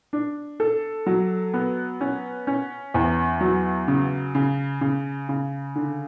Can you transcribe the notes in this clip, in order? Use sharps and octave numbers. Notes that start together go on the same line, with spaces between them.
D4
A4
F#3
B3
C#4
C#4
E2
F#3
C#3
C#3
C#3
C#3
D3